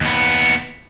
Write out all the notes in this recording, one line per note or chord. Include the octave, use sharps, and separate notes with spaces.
D#2 B3